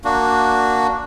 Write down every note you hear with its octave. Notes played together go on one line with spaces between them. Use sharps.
A#3 D4 F#4